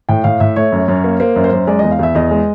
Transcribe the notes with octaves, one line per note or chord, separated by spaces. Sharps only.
A2 G5
A2 F5
A2 E5
A3 C#5
F#2
F#2
A#3
A#3 C5
F#2
C5
F#2
G#3 D5
E2 D#5
F5
E2 E5
E2 D#5
G#3